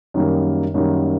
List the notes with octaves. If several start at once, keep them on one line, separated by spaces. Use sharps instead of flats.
F#2 D#3 G3 A#3
F#2 D#3 G3 A#3